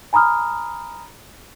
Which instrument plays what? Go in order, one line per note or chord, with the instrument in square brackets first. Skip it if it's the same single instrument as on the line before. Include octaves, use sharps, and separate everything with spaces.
[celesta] G#5 A#5 B5 D#6 F6